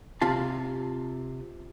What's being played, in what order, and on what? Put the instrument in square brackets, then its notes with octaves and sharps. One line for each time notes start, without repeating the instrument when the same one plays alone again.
[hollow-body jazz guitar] C3 F4 A5